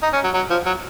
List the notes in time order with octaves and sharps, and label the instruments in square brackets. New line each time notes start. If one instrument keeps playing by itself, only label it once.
[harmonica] D#4
C#4
F#3
F#3
F3
F#3